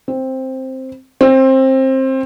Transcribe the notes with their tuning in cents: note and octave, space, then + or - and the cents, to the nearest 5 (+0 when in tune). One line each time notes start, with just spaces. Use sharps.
C4 +5
C4 +20